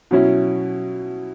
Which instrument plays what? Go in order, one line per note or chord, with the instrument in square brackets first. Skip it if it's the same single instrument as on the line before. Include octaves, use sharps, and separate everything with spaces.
[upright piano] B2 F#3 C#4 E4